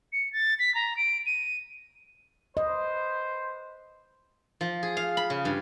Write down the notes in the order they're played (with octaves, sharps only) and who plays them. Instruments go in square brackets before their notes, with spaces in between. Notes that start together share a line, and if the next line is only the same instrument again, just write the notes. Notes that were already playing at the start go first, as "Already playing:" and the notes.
[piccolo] C#7
A6
B6
A#5
D7
D#7
[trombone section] B4 C5 [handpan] D#5
[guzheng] F3
G#4
F5
B5
C#3
G2